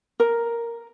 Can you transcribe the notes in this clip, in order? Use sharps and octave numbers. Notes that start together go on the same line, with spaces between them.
A#4